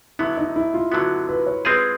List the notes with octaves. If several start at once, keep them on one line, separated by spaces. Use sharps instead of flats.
D3 F#3 B3 E4
D#4
E4
F4
D3 F#3 B3 F#4
B4
C#5
G#3 C4 F4 G#4 B4